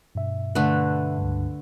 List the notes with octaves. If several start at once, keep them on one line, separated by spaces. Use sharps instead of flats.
G2 B2 E5
D3 A3 B4
C#2 G2